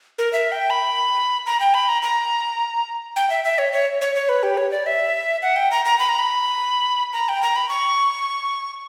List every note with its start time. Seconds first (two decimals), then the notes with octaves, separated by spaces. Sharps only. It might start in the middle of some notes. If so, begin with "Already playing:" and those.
0.18 A#4
0.33 E5
0.52 G5
0.70 B5
1.46 A#5
1.60 G5
1.74 B5
1.89 A#5
2.02 A#5
3.16 G5
3.30 E5
3.44 E5
3.58 C#5
3.73 C#5
4.01 C#5
4.15 C#5
4.29 B4
4.43 G4
4.57 C#5
4.71 D5
4.86 E5
5.42 F#5
5.56 G5
5.71 A#5
5.85 A#5
5.99 B5
6.09 A#5
6.19 B5
7.13 A#5
7.29 G5
7.42 A#5
7.56 B5
7.69 C#6